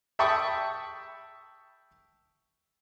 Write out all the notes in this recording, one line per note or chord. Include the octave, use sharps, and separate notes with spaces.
E5 G5 A5 B5 C#6 D#6